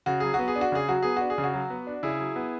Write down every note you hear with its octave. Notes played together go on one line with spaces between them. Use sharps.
C#3 F#4
F#3 G#4
B3 F#4
G#4
D4
F#4
C#3 G#4
F#3 F#4
B3 G#4
D4 F#4
G#4
C#3
F#4
F#3
B3
D4
C#3 E4 G#4
F#3
B3